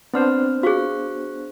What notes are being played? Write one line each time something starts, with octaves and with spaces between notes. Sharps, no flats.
B3 C4 D4 C5 C6 F6
F#4 G#4 F5 C#6 F#6